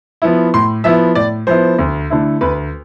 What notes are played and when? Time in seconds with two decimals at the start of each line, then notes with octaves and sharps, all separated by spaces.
0.22 F3 B3 E4
0.54 A2 C6
0.84 F3 B3 E4 E5
1.15 A2 D5
1.47 F3 B3 E4 C5
1.79 D2
2.10 D3 A3 E4
2.41 D2 B4